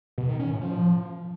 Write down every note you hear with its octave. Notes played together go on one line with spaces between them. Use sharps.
B2
D#3
C#4
A2
F3